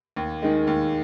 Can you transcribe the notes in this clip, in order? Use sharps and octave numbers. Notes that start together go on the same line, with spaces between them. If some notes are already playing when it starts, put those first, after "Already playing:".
D#2
D#3 G#3
D#2